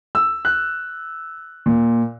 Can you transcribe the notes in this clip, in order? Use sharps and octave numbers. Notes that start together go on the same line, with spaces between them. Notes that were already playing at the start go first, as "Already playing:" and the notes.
E6
F#6
A#2